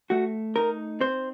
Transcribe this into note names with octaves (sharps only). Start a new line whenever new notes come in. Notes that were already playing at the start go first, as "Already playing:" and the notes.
A3 F#4
D#4 A#4
C4 C5